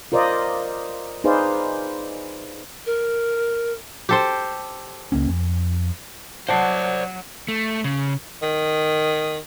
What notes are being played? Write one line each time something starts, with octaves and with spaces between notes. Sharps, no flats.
F4 A#4 C5 D5 D#5
D#4 G#4 B4 C5 D5 F5
A#4
G4 A4 C5
C#2 A#3 C#4
F2
F#3 C5 D5 F#5 A5 C7
A3
C#3
D#3